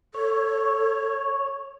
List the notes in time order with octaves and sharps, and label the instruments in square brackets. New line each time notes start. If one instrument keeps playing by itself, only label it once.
[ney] A4 [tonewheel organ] C#5